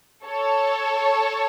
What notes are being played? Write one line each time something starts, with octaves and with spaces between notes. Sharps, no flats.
A4 C#5